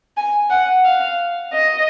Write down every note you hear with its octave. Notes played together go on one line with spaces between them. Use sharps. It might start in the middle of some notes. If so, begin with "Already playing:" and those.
G#5
F#5
F5
D#5